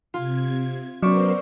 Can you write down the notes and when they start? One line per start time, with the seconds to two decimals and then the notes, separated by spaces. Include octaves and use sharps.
0.14 C3 F4 G#6
1.02 F#3 B3 C#4 A#4 C5 D5 E5 C#6